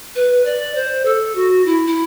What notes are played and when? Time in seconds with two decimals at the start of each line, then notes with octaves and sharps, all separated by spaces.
0.15 B4
0.45 D5
0.75 C5
1.05 A4
1.35 F#4
1.66 E4
1.87 E4